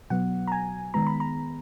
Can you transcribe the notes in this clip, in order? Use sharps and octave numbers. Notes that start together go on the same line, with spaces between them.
B2 F#3 B3 F#5
A#5
G#5
D#3 G#3 B3 A#5
B5
A#5